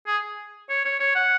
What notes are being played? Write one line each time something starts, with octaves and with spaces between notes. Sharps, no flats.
G#4
C#5
C#5
C#5
F#5